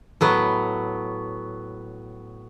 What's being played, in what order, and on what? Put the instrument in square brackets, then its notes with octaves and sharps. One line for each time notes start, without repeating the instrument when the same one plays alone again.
[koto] A2 F#3 B3